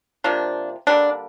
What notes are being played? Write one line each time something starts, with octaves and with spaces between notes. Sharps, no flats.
C3 F3 A#3 D4
D3 G3 A#3 D4